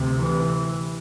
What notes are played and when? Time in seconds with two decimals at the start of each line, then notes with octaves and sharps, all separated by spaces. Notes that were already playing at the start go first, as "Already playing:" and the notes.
Already playing: D2 C3
0.18 E3